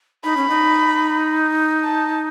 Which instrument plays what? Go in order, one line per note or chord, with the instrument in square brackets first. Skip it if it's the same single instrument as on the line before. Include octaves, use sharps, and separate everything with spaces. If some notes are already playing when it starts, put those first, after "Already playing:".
[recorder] D#4 [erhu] B5
[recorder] C#4
D#4
[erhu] A5